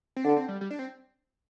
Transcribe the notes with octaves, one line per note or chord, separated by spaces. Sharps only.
C4
D3 D4
C4
G3
G3
D4
C4